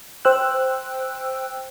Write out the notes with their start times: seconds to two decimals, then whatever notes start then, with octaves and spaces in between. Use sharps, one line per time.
0.25 C5 G5 E6 F#6